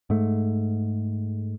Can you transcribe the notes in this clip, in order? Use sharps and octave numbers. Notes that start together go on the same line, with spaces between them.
G#2 A3